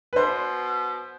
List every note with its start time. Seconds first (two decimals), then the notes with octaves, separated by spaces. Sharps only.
0.13 B4
0.16 B2 C5